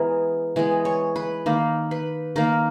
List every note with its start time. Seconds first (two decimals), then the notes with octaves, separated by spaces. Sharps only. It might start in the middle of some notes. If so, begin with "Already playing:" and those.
Already playing: E3 G#3 B3 G#4 A#4
0.56 E3 G#3 B3 G#4
0.85 C#5
1.16 B4
1.46 D#3 A#3
1.91 B4
2.36 D#3 A#3 A#4